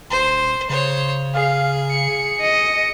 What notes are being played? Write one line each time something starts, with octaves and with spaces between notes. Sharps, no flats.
D#1 C5
C#3 C5 C#5
G#4 F5
C#7
D#5